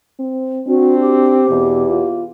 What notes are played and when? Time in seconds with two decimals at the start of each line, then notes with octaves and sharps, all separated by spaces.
0.19 C4
0.68 C4 D4 F#4
1.00 G4
1.49 E2 B2
1.89 F4